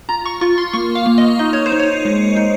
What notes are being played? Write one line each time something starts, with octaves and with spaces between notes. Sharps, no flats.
F4 A#5
C#6
F4 C#6
C6
A#3 C#6
F5
A#3
D#5
D#4 D#5
C#5
C5
D#4
C#5
G#3
D#4